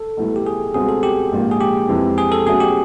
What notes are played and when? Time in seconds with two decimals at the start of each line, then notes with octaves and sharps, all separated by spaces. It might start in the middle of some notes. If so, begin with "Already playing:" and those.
Already playing: A4
0.17 B1 A2 E3 G3
0.36 G4
0.47 G#4
0.74 C#2 B2 G3 C4 G#4
0.89 A4
1.03 G4
1.32 A#1 G#2 F3 A#3
1.51 G#4
1.60 G4
1.88 F2 C3 E3 G#3
2.18 G#4
2.32 A4
2.46 B2 F#3 A3 C#4 G#4
2.60 G4